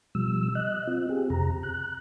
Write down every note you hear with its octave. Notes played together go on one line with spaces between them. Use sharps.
B2 F3 G3 E6
D#5 F#6
C4 F4
C4 G4 G#4
F2 C3 A#5
F#6